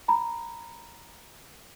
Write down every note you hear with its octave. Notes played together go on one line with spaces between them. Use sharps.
A#5 B5